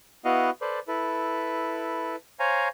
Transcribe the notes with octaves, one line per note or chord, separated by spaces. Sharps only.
B3 E4 F#4 D#5 F5 F#5
A4 B4 C5 D5
E4 A4 B4
C5 C#5 F5 G#5 A#5